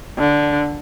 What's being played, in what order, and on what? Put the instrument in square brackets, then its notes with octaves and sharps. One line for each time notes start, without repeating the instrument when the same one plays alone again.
[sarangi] D3